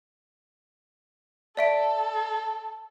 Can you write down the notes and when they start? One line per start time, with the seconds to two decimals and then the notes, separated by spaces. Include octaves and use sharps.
1.57 A4 D5 E5 D7